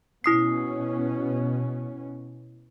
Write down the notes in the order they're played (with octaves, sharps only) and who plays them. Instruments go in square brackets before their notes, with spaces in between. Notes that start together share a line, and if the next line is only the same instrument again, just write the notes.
[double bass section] B2 C#4 [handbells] E4 D#6 C7